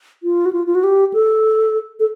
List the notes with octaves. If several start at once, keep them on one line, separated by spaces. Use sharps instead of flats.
F4
F#4
F4
F4
F#4
G4
A4
A4